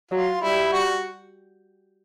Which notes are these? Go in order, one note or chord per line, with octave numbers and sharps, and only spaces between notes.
F#3 F4
G3 E4
F#4